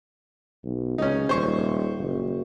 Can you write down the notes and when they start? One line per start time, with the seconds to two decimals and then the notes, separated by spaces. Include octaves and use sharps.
0.64 B1
0.98 C#2 C#4 D#4
1.29 D#1 C5 C#6
1.98 F#1